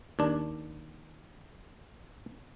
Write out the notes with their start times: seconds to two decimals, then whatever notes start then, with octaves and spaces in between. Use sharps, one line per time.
0.19 D#2 D4